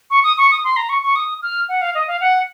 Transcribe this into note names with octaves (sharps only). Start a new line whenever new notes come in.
C#6
D#6
C#6
D#6
C6
A#5
C#6
C#6
D#6
F6
F#5
F5
D#5
F5
F#5